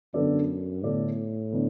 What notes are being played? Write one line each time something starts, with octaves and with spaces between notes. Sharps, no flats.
F#2 D3 B3 D4 A4 D5
A2 D3 B3 D4 A4 D5
D3 B3 D4